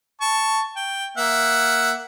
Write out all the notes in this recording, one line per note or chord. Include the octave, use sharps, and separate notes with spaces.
A5 C#6
G5
A#3 E5 F#5